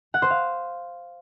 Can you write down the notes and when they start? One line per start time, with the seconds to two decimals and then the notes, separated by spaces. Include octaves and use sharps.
0.14 F#5
0.22 C5
0.30 F5